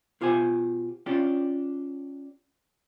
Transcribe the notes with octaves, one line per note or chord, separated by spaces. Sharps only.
B2 F4 G4 C5 G#5
C#4 D4 F4 G4